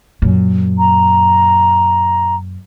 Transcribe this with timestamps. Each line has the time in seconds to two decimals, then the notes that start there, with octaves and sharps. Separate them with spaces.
0.22 F#2 A#2
0.79 A#5